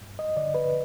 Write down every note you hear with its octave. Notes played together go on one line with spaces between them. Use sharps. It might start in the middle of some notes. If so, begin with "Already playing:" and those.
G2
D#5
D3 D5
B4